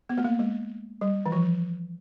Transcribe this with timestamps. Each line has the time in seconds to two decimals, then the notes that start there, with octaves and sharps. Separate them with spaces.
0.09 B3
0.18 A3
0.24 A#3
0.39 G#3
1.01 G3
1.26 E3
1.32 F3